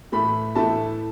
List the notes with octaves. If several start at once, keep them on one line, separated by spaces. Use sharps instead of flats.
A2 E3 A3 E4 B5
A2 E3 A3 E4 A5